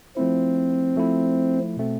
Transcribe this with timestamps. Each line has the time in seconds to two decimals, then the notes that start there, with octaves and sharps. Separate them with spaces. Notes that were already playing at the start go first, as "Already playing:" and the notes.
0.17 F3 A3 C4 E4
0.96 F3 A3 E4
1.77 B2 A3 C4